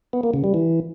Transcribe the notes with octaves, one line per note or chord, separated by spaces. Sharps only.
B3
A#3
C#3
G3
E3